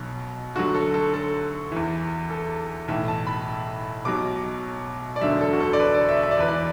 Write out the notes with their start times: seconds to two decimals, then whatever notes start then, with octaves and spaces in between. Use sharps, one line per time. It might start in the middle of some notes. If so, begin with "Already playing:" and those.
Already playing: B1 B2 F#3
0.55 D2 D3 F#3 F#4
0.74 A4
0.94 A4
1.14 A4
1.72 E2 E3
2.31 A4
2.88 B1 A2 E3 E5
3.08 A5
3.27 B5
4.05 B1 B2 F#3 D6
5.16 D5
5.21 E1 D2 D3 F#3 E5
5.41 A4
5.53 F#4
5.60 A4
5.73 D5
5.80 B4
5.94 D5
6.09 E5
6.23 E5
6.31 D5
6.37 E2 E3 B4
6.48 D5